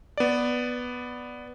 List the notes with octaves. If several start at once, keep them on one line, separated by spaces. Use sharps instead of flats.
B3 D5